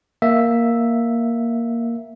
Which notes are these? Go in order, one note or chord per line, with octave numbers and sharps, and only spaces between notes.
A#3 E5